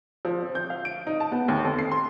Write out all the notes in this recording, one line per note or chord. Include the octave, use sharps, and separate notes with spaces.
F3
C4
G6
F5
D7
D#4
A5
B3
D#2
F2
C7
C6